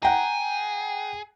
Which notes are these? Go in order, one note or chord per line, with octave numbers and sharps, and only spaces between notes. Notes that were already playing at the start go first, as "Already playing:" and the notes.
G#4 F#5 G5 A#5